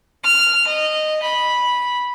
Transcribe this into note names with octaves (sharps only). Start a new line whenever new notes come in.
F6
D#5
B5